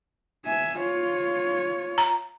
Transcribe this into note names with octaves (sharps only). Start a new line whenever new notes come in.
E5 G#5
F4 C#5
A#5